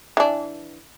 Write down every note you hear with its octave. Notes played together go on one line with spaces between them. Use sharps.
E3 D4